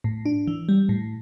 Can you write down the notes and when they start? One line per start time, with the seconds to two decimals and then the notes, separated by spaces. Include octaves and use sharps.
0.04 A2
0.26 D4
0.48 E3
0.69 G3
0.89 A2